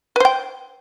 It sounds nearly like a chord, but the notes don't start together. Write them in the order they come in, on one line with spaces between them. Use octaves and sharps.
B4 C5 G5